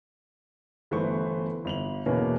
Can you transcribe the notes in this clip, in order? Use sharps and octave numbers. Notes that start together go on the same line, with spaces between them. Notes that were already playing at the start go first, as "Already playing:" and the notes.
G1 E3 A3 B3 C5 C#6
G1 F7 F#7
E2 B2 E3 A#3 B3 C#4